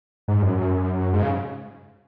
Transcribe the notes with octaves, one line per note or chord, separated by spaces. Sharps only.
G#2
F#2
F#2
G#2
C#3